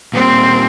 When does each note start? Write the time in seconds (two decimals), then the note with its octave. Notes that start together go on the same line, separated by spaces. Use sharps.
0.14 A#2 G3 A#3 C4